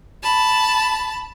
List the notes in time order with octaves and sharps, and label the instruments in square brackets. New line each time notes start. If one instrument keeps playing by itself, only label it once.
[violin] A5 B5